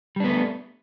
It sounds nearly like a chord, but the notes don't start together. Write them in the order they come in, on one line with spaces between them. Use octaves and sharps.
G3 D4 B3 A3